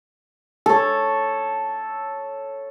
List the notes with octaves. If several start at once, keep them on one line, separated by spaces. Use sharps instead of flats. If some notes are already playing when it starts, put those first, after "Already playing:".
A4 C#5